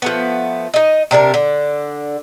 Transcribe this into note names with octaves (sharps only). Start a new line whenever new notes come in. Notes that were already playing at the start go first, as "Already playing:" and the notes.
F3 A3 B3
D#4 D#5
C3 D4 G#4 A#4
D3